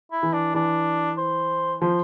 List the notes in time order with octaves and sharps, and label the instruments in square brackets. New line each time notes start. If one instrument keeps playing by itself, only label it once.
[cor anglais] E4
[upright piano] E3
[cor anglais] D4
[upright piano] E3 [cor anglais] D4
[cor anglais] C5
[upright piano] F3 [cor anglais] C5